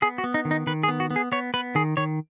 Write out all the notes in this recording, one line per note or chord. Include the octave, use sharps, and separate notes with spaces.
B3 G#4
F#4
B3
D#4
D#3
D#4
D#3 B4
G#4
B3
F#4
B3
G#4
B3 C#5
B3 B4
D#3 G#4
D#3 C#5